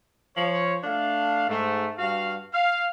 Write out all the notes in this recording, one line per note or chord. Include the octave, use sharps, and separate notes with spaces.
F3 C#5
A3 D4 F5
G#2 A3
G2 F#4 F5
F5